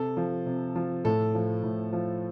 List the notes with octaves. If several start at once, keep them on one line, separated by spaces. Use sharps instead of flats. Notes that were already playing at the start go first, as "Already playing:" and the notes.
Already playing: C3 A4
F3
C3
F3
A2 A4
F3
A2
F3